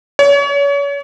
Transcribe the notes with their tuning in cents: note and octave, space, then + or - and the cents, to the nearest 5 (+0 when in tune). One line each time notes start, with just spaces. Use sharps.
C#5 +35